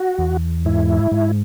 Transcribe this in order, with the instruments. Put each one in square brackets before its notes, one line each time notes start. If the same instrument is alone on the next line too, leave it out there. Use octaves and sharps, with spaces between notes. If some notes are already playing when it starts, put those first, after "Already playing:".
Already playing: [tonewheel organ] F#4
E2
G#2 E4
G#2